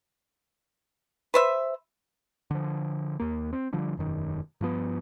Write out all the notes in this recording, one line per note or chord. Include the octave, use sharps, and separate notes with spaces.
B4 C5 E5
D3 F3
D#2 A#3
C4
D3 F3 G3
E1 F#2 D#3
G2 F3 B3